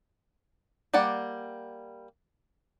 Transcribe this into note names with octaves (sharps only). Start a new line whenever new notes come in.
G3 A#3 D5 F#5